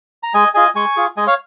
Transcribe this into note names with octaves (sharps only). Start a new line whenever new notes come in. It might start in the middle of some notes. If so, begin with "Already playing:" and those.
A#5
G#3 D#5 G#5
F4 G#4 D#5 G#5
G#3 G#5 C#6
F4 G#4
G#3 D#5 G#5
C#5 F5